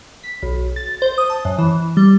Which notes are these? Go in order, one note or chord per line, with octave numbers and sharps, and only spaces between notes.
B6
B1
A6
C5
D#6
A5
F#2
E3
G3